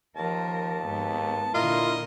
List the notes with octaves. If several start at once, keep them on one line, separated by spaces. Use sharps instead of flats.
D#2 F3 A#4 A5
G#2 B3
A#2 D3 E4 F4 A#4 D#5